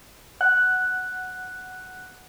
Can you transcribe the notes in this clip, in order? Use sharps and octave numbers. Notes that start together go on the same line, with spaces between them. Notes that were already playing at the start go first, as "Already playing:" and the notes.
F#5 F#6